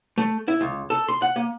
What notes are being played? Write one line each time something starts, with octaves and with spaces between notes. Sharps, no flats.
A3
E4
C#2
A4
C6
F#5
A#3